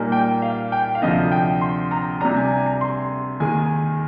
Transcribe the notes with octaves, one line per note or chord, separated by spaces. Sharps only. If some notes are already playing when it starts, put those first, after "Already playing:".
Already playing: A#2 G3 A#3 D#4 G#5
G5
F5
G5
F5
D2 C3 F3 D#5
G5
C6
A#5
C3 G3 D4 A#5
G#5
G#5
A#5
C6
D#2 D#3 G#3 G#5
G#5